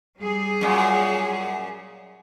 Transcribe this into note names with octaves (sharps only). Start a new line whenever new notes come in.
G3 G#4
F#2 A#2